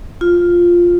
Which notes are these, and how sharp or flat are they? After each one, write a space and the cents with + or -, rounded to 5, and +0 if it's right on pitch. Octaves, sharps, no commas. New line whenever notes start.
F4 +0